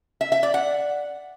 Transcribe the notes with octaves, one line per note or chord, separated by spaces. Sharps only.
E5
E5
D5
F#5